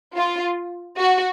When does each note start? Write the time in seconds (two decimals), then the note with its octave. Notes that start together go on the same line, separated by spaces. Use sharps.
0.16 F4
0.97 F#4